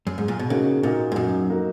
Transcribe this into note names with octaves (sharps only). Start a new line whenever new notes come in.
F#2
G#2
A#2
B2
C#3 A#3 D#4 F#4
A#2 A#3 D#4 F#4
G#2
F#2 A#3 D#4 F#4
A#3 D#4 F#4